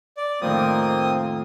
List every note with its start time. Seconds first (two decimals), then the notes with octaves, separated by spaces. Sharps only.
0.17 D5
0.41 F2 A2 D#3 A#3 C4 D#6